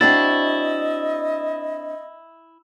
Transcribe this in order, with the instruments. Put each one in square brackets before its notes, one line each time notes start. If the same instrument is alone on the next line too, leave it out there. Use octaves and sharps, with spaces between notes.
[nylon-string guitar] C4 D4 F#4 [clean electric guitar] E4 [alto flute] D#5 [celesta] A6